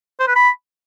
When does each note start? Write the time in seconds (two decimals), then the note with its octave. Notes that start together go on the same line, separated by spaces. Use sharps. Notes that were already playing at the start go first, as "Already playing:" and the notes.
0.19 C5
0.28 B4
0.36 B5